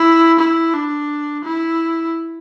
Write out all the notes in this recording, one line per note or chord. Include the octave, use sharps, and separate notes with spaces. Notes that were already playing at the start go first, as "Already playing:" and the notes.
Already playing: E4
E4
D4
E4